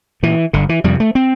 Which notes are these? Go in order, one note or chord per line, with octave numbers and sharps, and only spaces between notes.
A#2 E3
G1 D3
E3
F2 C3 G3
A3
C4